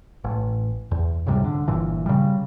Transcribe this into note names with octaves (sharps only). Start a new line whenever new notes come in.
A1
E2
C#2 G#2 C3 G3
D3
G1 A#2 E3
C#3 G3